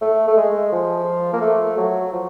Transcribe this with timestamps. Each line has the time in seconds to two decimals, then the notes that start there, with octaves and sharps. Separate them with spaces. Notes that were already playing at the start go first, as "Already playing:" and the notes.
0.01 A3
0.28 A3
0.37 G#3
0.72 F3
1.33 A#3
1.42 A3
1.77 F#3
2.12 F3